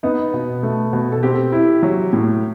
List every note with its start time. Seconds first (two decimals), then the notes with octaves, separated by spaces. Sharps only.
0.03 B3 D#4
0.33 B2
0.63 A3
0.93 B2
1.12 A4
1.23 C4 G4
1.52 E4
1.83 F#3
2.13 A2